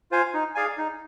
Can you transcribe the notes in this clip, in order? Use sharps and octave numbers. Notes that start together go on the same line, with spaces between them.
F4 C5 F5 G#5
D#4
G#4 D5 F5 G#5
D#4